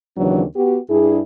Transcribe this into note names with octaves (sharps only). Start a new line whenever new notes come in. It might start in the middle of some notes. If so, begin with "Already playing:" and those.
D#2 C#3 E3 F#3 C4 D4
B3 F#4 G4
G2 D4 E4 G#4